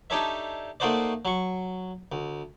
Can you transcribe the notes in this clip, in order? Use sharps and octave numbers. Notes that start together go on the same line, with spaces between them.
D4 D#4 G4 A4 C#5 E5
A3 A#3 D#4 F#4 C5 D5
F#3 C#6
D2